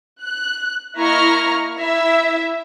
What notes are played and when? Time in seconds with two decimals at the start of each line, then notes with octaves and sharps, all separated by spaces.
0.23 F#6
0.96 A#3 E4 D#5 A#5 C#6 F6
1.81 E4 E5